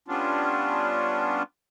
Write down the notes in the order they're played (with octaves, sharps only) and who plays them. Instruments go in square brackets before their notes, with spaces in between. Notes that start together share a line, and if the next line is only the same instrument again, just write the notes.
[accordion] G3 B3 C#4 D4 F4